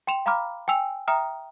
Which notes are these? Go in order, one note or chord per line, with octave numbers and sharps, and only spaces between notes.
G5 C6 E7 F7
F5 A#5 B5 D6 F6
G5 G#5 E6 F7
E5 G5 A#5 D#6 F6